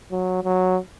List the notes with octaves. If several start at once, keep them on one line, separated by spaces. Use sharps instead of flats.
F#3
F#3